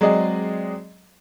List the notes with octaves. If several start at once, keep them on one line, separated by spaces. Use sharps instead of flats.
F#3 G#3 C4 G#4 D5 D#5